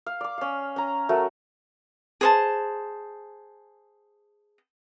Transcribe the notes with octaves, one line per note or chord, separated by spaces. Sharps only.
F5
D5 D6
C#4 F5
C#4 A#5
F#3 A3 A#4
G#4 C5 A5